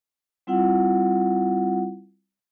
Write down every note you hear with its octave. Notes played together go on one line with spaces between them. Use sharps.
G3 C4 E4 F4 F#5